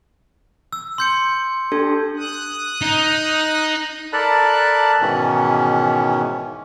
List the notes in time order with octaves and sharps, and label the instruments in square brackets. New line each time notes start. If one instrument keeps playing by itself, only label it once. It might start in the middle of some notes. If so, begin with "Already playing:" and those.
[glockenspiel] E6
C6 G6 C#7
[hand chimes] D4 G4 A4
[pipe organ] D#6 F#6
[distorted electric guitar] D#4
[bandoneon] A4 A#4 D5 A5 B5 F#6
G#2 B2 D#3 E3 C#4